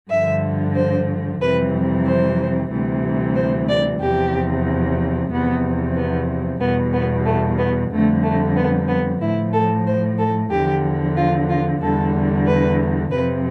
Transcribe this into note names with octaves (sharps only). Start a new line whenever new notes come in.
G2 D3 F3 E5
C5
F2 C3 E3 G3 B4
C5
D2 C3 E3 G3
C5
D5
E2 C3 F3 G4
E2 C3 F3 B3
B3
E2 B2 G3 B3
B3
A3
B3
F2 D3 G3 A3
A3
B3
B3
A2 F3 E4
A4
C5
A4
E2 D3 F3 G4
F4
F4
E2 D3 G3 A4
B4
F2 C3 F3 B4